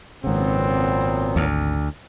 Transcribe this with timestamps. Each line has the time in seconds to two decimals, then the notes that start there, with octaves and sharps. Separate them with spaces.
0.24 G#1 A#2 C#3 F#3 B3 C4
1.36 D2